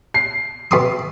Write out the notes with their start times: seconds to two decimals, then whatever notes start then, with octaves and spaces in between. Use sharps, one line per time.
0.14 C7
0.71 B2 C6 D#6